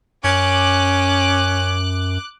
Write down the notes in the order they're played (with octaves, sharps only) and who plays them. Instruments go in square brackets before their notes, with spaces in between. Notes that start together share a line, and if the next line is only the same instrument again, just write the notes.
[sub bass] F#2 [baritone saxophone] C#4 [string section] D6 F#6